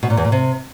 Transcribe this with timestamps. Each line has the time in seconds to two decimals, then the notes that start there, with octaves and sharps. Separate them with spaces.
0.03 B2
0.10 A#2
0.17 E2
0.25 A#2
0.32 C3